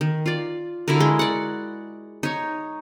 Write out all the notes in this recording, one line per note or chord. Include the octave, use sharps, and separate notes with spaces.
D#3
F4 D5
D3 E4 F#4 A#4
G#3
D5 F#5
D#4 C#5